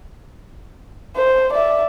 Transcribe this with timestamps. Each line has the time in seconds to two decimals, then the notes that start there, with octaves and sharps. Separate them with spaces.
1.16 C5
1.53 D5 E5